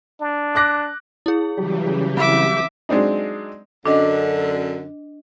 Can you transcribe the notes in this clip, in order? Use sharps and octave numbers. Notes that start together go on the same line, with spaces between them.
D4
D6 F#6 A#6
E4 G#4
C#3 E3 F#3 G3 G4
C4 E5 D6
F#3 G#3 C4 D4 D#4
F#2 D3 D4 D#5